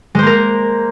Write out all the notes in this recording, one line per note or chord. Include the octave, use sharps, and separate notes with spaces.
G#3 A#3 A#4 C5